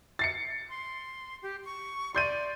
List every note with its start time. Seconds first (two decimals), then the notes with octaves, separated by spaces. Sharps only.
0.19 A6 C7 C#7
0.69 C6
1.42 G4
1.65 C#6
2.15 D5 C6 G6 D#7